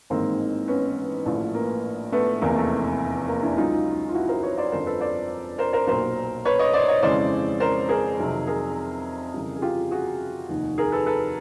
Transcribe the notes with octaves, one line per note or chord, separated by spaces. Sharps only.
A1 G#2 D#3 G#3 A#3 C4
B3 C#4
A#1 A2 F3
A#3
A3 B3
F1 E2 C3 A#3
A3
A#3
D4 E4
C#2 C#3 F#3 D#4 F4
F4
E4 F#4
A#4 C5
B4 C#5
C5 D5
G1 F2 D3 F3 A#4 C5
A4 B4
C5 D5
A#4 C5
A#4 C5
B1 A#2 F#3 A#4 C5
B4 C#5
C#5 D#5
C5 D5
C#5 D#5
F2 C#3 E3 G#3 C5 D5
A#4 C5
G#4 A#4
F2 C3 D#3 F#3
G#4 A#4
F2 C#3 E3 G3
G#4
F4 G4
F#4 G#4
F1 D#2 D#3
G#4 A#4
A4 B4
A4 B4